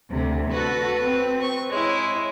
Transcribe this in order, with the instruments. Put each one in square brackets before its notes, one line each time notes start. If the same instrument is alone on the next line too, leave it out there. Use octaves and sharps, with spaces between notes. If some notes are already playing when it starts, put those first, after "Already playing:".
[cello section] D2 C3
[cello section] F#4 A4 [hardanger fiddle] B4
[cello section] C4
[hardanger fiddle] C#6
[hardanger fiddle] G#3 E4 [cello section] C#5